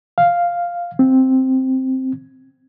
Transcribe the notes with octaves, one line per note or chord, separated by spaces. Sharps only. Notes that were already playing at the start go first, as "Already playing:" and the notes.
F5
C4